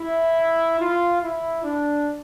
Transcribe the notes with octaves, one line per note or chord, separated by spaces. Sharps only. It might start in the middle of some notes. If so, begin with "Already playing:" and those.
Already playing: E4
F4
E4
D4